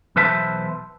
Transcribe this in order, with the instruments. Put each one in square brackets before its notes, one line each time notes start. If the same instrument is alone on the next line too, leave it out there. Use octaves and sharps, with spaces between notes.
[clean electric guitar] B1 E3 B4 C5 E5 A5